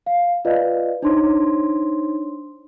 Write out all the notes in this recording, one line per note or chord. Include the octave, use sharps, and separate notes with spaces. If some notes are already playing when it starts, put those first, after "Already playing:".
F5
F4 B4 D5 D#5 F5
D4 D#4 C5 C#5 C6